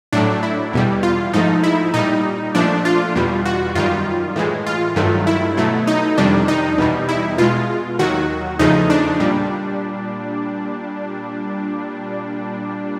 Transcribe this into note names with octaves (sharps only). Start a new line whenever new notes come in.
A2 F#3 A3 D4
E4
E2 B2 G3
F4
G#2 F3 A3 D#4
E4
A#2 G3 D#4
A#2 F3 A3 D4
F4
E2 B2 G3
F#4
F#2 D#3 G3 F4
A2 E3 G#3
F4
G2 D#3 F#3 A3
E4
B2 F#3 A3
D#4
F2 C3 D#3 G3 D4
D#4
E2 B2 G3
E4
B2 G#3 F4
D#2 D#3 F#3 F#4
E2 C#3 F3 A3 D#4
D4
A#2 G3